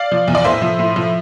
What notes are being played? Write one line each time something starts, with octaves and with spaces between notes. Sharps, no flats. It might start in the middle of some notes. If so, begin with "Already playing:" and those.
Already playing: D5 F5
F3
E2
D5
A2 C5 E5
F3
A2
F3